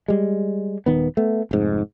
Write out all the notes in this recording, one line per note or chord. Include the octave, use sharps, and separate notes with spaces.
G3 G#3
D#1 D#3 B3
A3 B3
F1 G#2